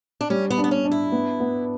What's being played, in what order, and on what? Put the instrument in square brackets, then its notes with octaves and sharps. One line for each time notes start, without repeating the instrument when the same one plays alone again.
[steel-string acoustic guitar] D4
[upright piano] G3 [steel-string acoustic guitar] C#4
[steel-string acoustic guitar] B3
[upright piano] D4
[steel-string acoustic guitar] B3
C#4
[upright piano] D4
[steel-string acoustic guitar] E4
[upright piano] B3
B3